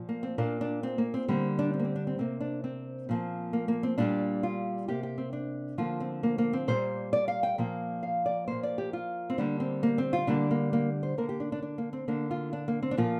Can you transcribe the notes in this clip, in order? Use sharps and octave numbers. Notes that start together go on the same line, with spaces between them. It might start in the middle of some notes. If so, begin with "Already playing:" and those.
Already playing: A#2 F3
A#3
C4
A#2 A#3 D4
D4
C4
A#3
C4
D3 G3 A#3 C4
D4
C4
A#3
C4
D4
C4
C3 A#3 C4
D4
C4
A#2 F3 A#3
A#3
A#3
C4
A#2 G3 A#3 D4
F4
C3 A#3 G4
G4
C4
D4
D3 F3 A#3 F4
C4
A#3
A#3
C4
A#2 G3 A#3 C5
D5
F5
G5
A#2 F3 A#3
F5
D5
A#2 F3 A#3 C5
D5
G4
F4
C4
D3 G3 A#3 D4
C4
A#3
C4
F4
D3 G3 A#3 D4
A#3
A#3
C5
D3 A#3 A#4
G4
D4
D4
D4
A#3
C4
D3 A#3 D4
F4
D4
A#3
C4
D4
A#2 F3 A#3 F4